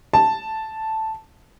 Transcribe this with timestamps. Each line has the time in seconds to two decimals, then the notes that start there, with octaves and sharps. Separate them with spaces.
0.14 A5